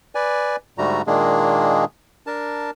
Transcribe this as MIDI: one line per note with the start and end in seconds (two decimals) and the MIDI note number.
0.15 0.56 71
0.15 0.56 74
0.15 0.56 80
0.78 1.02 44
0.78 1.02 50
0.78 1.02 55
0.78 1.02 57
0.78 1.02 66
0.78 1.02 82
1.07 1.85 46
1.07 1.85 51
1.07 1.85 56
1.07 1.85 58
1.07 1.85 62
1.07 1.85 68
2.27 2.71 62
2.27 2.71 70
2.27 2.71 81